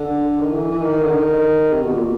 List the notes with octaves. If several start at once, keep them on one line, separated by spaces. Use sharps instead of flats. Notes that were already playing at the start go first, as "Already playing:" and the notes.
Already playing: D3
D#3
E3
E3
D#3
D3
D#3
C3
B2
A#2